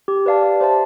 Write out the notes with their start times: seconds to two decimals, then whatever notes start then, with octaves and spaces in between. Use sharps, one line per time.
0.08 G4
0.26 B4 D5 F5 A5
0.43 G4
0.61 C5 E5 A5